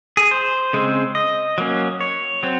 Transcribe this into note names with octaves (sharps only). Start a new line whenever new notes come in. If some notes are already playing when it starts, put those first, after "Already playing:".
G#4
C5
C#3 G#3 C4
D#5
F#3 A#3 C#4
C#5
F#3 C4